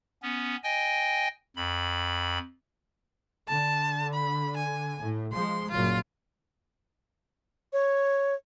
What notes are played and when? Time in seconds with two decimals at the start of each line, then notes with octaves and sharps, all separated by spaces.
0.22 B3 C#4
0.63 D#5 G5 G#5
1.56 F2 B5
3.48 D3 A5
4.14 B5
4.57 G#5
4.99 A2
5.33 F3 G#3 C6
5.71 F#1 A#2 F#3 F4
7.73 C#5